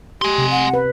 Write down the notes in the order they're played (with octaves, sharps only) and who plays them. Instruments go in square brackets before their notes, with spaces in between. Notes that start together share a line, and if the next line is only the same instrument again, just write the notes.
[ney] G4 [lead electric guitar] G#5 C6
[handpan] C3
[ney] F#5
[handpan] B4